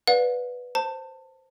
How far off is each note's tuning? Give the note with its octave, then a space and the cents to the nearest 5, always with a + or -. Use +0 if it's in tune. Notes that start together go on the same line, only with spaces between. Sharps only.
B4 +0 D5 +0 F#5 -45
C5 +0 A5 +25